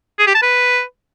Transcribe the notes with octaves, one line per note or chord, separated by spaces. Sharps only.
G#4
G4
A5
B4